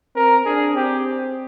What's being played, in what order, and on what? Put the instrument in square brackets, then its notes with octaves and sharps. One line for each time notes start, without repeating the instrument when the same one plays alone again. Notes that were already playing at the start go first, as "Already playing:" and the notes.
[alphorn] C4 [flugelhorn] A#4
[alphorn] D4 [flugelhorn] G#4
[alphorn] C4 [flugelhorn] G4